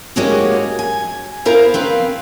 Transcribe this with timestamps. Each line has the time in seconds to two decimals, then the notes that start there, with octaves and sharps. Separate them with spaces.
0.16 G#3 A#3 C#4 D#4 F#4 G4
0.79 G#5
1.45 B3 E4 A#4 C5 F5 A#5
1.74 C4 B4 F5